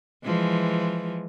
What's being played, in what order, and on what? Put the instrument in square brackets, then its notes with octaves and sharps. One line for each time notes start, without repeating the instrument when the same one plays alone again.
[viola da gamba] E3 F3 G#3